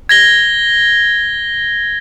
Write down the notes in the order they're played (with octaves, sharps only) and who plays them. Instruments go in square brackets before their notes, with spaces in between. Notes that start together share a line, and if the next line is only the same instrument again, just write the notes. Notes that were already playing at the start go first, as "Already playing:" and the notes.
[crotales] G#6 A#6 G7